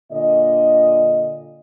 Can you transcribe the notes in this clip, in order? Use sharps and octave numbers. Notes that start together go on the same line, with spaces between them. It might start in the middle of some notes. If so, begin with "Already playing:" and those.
A#2 D3 D#5